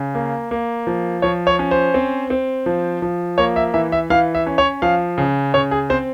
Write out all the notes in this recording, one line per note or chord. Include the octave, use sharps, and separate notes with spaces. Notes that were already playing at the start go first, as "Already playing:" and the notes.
Already playing: C#3
A#3
A#3
F3
F3 C#5
C#5
C#4
C5
C4
C4
F3
F3
A#3 C#5
E5
E3 E5
E5
E3 F5
E5
C#4
C#5
F3 F5
C#3
C#3 C#5
G#4
C4 C5